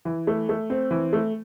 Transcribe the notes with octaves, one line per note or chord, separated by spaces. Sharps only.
E3
A3
A3
C4
E3
A3